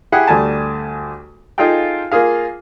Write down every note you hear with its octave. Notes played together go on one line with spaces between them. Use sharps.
E4 G4 G#4 F#5
D2 G3 A3 G#5 A5
D#4 F4 G#4 A4 F5 G5
A#3 F4 G#4 F5